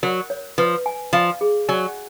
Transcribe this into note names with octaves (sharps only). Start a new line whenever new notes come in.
F#3 A#4
C#5
F3 B4
G#5
F3 F5
G#4
F#3 G#5